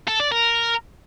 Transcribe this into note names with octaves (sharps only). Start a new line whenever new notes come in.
A4
D5
A#4